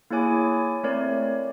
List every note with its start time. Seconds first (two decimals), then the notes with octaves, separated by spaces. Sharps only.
0.10 A#3 E4 G#4 C#5 G#5 D6
0.83 A3 C4 A#4 C#5 D5